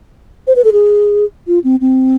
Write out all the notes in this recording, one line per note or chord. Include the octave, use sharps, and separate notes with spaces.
C5
B4
A4
G#4
F4
C4
C4